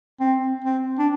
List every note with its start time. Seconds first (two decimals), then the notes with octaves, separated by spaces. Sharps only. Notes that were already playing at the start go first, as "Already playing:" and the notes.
0.20 C4
0.64 C4
0.99 D4